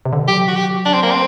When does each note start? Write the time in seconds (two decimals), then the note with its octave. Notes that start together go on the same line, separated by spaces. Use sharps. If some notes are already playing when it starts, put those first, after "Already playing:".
0.05 C3
0.13 D3
0.21 D#3
0.28 F#3 G4
0.48 F#4
0.56 G4
0.85 D4
0.94 C4
1.03 A#3
1.11 C4